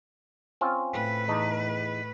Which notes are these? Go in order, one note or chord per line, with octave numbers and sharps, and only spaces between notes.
C4 C#4 F4
A2 B4
E2 D#4 A5